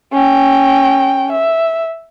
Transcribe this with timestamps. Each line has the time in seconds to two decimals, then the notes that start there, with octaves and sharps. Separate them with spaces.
0.12 C#4 G5
1.32 E5